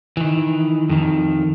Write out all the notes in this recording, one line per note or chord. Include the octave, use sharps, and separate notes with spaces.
D#3 E3
F2 D#3